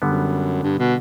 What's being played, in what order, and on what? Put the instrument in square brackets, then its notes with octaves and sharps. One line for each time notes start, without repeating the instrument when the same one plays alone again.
[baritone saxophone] F#2 [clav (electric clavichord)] D3 G3 B3
[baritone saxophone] G2
B2